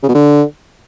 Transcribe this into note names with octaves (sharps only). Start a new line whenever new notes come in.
C#3
B2
D3